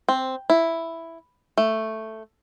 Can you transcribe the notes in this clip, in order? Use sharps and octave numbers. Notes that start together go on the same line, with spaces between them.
C4
E4
A3